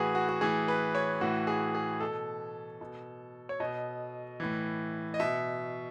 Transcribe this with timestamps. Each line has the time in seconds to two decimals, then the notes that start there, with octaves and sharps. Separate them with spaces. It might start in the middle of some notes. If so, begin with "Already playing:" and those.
Already playing: A2 E3 F#4 G#4 B4
0.15 F#4
0.29 F#4
0.41 A2 E3 G#4
0.68 B4
0.95 C#5
1.21 A2 E3 F#4
1.47 G#4
1.75 G#4
2.00 B2 A4
2.81 B2
3.49 C#5
3.60 B2 D#5
4.40 A2 E3
5.14 D#5
5.20 B2 E5